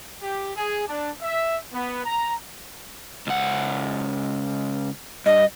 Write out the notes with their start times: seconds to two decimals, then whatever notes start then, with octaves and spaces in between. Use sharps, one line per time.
0.21 G4
0.56 G#4
0.87 D4
1.22 E5
1.72 B3
2.03 A#5
3.27 C#2 F#5
5.26 G2 D#5